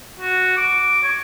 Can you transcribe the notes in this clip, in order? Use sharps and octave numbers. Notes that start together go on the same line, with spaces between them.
F#4
D6
C#5